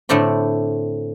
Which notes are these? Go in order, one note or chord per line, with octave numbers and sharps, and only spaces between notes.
A2 D3 A3 C4 D5 G5